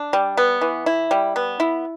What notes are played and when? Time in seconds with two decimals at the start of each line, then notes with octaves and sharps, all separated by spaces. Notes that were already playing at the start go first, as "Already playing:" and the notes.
Already playing: D4
0.13 G3
0.37 B3
0.61 E3
0.86 E4
1.11 G3
1.36 B3
1.60 E4